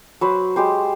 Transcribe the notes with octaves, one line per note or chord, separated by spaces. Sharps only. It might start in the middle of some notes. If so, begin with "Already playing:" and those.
F#3 B4 C5
G#3 G4 C5